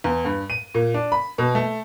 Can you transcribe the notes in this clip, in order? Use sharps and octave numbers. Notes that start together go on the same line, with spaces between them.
E2
G2
D#7
A#2
D4
B5
B2
A3